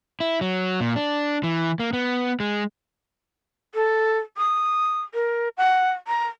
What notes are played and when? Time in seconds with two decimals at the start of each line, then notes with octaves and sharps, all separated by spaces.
0.20 E4
0.41 F#3
0.80 A#2
0.96 D4
1.43 E3
1.80 A#3
1.93 B3
2.40 G#3
3.75 A4
4.37 D#6
5.14 A#4
5.57 F#5
6.08 A#5